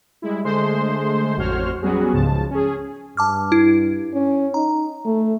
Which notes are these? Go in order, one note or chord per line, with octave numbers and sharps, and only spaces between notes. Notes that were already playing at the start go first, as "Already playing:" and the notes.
G3 G#3 E4
D3 G#3 A3 C5 C6
A1 F2 F#4 C5 C#5 F6
F#3 G3 B3 C#4 F#4 G#4
C#2 G#2 C#3 F3 C#4 A5
C#4 G#4
G2 A5 D6 F6
E4
C#4
D#4 A#5
A3